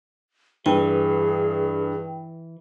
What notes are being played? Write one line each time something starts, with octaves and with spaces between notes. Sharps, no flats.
G2 E3 G#4 G5